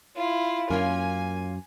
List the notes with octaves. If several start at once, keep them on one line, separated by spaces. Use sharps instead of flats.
E4 F4
F#2 A#3 C#4 F4 G#5